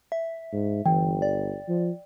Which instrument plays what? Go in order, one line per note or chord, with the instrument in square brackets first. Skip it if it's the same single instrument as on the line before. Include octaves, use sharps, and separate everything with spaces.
[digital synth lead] E5
[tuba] G#2
[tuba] G1 [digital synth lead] E3 [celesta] G5
[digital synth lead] D5
[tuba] F3